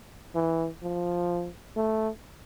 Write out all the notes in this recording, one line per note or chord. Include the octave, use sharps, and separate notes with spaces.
E3
F3
A3